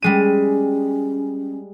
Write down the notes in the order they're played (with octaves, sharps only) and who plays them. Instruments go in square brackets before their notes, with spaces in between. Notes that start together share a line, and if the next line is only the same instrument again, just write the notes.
[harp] G3 G#3 D#7 [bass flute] C#4